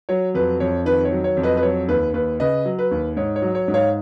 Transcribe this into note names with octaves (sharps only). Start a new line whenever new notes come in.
F#3 C#5
F2 B4
F2 C#5
D#3 B4
C#5
F#3
C#5
F2
B4 D#5
B4
F#3 C#5
D#2 B4
D#2 B4
C#3 B4 D#5
F#3
B4
D#2
G#2 C#5
C#5
F#3
C#5
G#2
C#5 F5